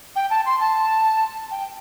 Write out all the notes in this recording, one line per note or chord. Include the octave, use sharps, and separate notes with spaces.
G5
A5
C6
A5
G5